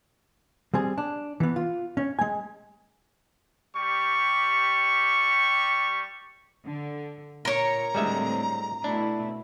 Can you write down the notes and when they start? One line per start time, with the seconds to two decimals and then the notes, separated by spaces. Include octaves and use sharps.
0.74 G3 C4 G#4
0.98 D4
1.40 E3 B3
1.56 F4
1.97 C#4
2.19 G#3 G#5
3.76 G3 G4 C#6
6.66 D3
7.45 A#2 A#4 C#5 A#5
7.94 A2 D3 G3 G#3 C4 E5
8.84 B2 A3 D4 E4